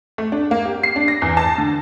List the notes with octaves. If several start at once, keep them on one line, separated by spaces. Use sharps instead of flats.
A3
D4
A#3
G4
C7
D4
A#6
E2
A5
D3